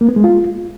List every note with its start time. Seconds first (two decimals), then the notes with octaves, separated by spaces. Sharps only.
0.01 A#3
0.09 B3
0.16 G#3
0.24 F4